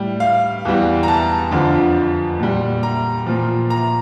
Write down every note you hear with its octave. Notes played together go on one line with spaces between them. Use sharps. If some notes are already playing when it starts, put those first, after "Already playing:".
Already playing: A2 G3
F5
E2 E3 G3
A#5
A5
F2 D3 F3
A#2 G3
A#5
A#2 F3
A#5